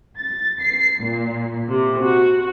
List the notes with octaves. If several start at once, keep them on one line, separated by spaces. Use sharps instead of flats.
A6
C7
A#2
C3
F#4